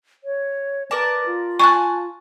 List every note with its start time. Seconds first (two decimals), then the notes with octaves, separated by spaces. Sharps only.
0.24 C#5
0.91 A#4 B4 D5 A5
1.26 F4
1.60 G#5 A5 C#6 F#6